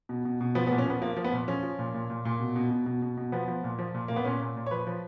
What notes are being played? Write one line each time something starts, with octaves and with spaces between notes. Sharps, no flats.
B2
B2
B2
F3 B3
B3
A#2
C#4
F3 B3
F3 A#3
F3
B3
A#2
F3 C#4
F3
A#2
A#2
A#2
A#2
B2
B2
B2
B2
B2
B2
F3 B3
F3
A#2
F3
A#2
A#2 A#3
B3
A#2 C#4
A#2
A#2
C#5
F3 B4
F3